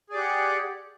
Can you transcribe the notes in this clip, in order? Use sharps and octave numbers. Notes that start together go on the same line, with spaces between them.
G4 G#4 D5 F#5